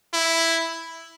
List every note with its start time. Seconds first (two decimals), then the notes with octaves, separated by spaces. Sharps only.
0.14 E4